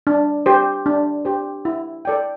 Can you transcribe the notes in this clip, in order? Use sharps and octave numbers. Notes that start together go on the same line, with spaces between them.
D4
G4 C5
D4
G4 C5
E4
A4 D5 G5